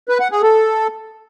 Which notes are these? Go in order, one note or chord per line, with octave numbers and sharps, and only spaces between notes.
B4
F#5
G#4
A4